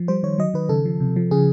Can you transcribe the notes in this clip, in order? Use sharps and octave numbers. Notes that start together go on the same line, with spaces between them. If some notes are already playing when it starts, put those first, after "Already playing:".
Already playing: F3
G3 C5
D#3 C#5
F#3 D#5
D#3 B4
C#3 A4
F3
C3
F3
C#3 G#4